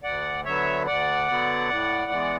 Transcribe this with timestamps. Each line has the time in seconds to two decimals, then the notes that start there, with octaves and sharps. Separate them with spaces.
0.03 D2 D5 F#5
0.45 D3 F#3 B3 C#5 E5
0.86 D2 D5 F#5
1.28 D3 F#3 B3
1.70 A2
2.12 E3 G#3 B3